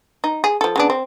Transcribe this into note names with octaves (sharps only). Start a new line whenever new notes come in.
D#4
G#4
F3 A4
C#3 B3 D4
C4